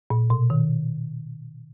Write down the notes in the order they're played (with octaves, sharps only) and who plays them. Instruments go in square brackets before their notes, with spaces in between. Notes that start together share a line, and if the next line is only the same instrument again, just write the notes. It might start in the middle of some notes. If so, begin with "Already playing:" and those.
[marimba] A#2
B2
D#3